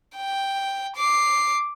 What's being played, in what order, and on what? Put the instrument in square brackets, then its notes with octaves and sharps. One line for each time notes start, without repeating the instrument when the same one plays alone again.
[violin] G5
D6 C7